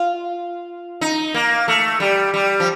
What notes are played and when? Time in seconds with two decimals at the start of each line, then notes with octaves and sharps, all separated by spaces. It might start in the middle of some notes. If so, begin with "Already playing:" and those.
Already playing: F4
1.01 D#4
1.34 A#3
1.68 A3
2.00 G3
2.34 G3
2.60 F3